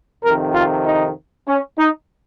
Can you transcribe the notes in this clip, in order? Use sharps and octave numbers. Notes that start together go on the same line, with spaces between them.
F2 C3 D#3 A#4
F4
D#4
C#4
D#4